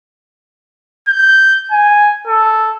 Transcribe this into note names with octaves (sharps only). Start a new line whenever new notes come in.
G6
G#5
A4